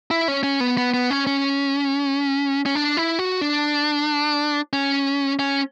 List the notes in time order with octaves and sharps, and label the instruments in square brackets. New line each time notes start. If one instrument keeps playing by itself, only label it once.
[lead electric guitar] E4
C#4
C#4
B3
B3
B3
C#4
C#4
C#4
D4
E4
F#4
D4
C#4
C#4